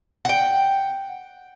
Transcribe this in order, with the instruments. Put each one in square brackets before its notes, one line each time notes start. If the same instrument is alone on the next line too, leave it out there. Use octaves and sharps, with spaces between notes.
[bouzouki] F#5 G5